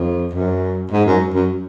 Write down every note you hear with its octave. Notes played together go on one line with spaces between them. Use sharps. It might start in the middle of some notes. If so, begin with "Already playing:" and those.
Already playing: F2
F#2
G#2
F#2
F#2